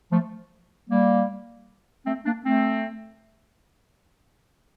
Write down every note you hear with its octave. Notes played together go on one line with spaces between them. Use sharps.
F3 A3
G3 A#3
A3 C4
A#3 D4
A3 C4